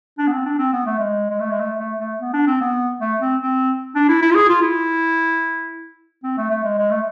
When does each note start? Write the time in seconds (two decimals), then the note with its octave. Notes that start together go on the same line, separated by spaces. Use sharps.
0.18 D4
0.27 B3
0.32 C4
0.46 D4
0.59 C4
0.73 B3
0.86 A3
0.99 G#3
1.30 G#3
1.40 A3
1.51 G#3
1.60 A3
1.80 A3
2.00 A3
2.21 B3
2.33 D4
2.47 C4
2.61 B3
3.01 A3
3.21 C4
3.42 C4
3.95 D4
4.09 E4
4.22 E4
4.31 F4
4.35 G#4
4.49 F4
4.62 E4
6.24 C4
6.37 A3
6.50 A3
6.64 G#3
6.78 G#3
6.91 A3